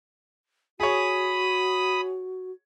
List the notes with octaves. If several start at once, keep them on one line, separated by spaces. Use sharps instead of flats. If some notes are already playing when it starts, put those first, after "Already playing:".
F#4 G#4 C#5 B5 D#6